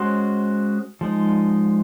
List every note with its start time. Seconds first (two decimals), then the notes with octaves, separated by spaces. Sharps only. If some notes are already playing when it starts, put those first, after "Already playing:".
Already playing: G#3 C#4 F#4 C5
1.01 F3 G#3 D#4